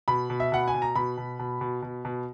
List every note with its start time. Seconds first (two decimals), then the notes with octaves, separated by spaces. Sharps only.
0.08 B2 B5
0.30 B2
0.40 E5
0.52 B2 F#5
0.68 G#5
0.74 B2
0.82 A#5
0.95 B2 B5
1.17 B2
1.39 B2
1.61 B2
1.82 B2
2.05 B2